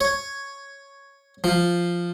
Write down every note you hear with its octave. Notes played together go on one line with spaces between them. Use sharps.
C#5
F3